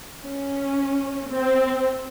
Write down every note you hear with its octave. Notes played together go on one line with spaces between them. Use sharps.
C#4
C4